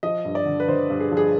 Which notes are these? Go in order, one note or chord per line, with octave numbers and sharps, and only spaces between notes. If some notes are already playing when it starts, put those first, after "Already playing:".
F3 D#5
G2
D5
D3
B4
D3 C5
G2
G#4
F3
G#4